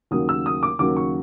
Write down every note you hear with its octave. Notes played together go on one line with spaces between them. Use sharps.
D#2 C#3 F#3 A#3 D#6
E6
D#6
D6
D#2 C#3 F#3 A#3 D6
C#6